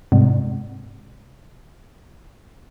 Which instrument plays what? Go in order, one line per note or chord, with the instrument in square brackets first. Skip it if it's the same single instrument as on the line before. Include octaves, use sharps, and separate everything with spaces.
[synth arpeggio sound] G#2 C3